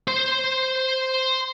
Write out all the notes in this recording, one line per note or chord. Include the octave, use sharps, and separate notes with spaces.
C5 C6